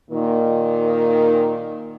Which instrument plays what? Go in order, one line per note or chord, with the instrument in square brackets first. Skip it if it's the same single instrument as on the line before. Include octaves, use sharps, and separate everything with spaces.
[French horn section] A#2 D#3